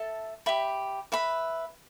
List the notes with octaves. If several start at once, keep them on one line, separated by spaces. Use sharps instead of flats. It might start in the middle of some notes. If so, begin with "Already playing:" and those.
Already playing: A4 E5 A5
G4 E5 B5
B4 E5 B5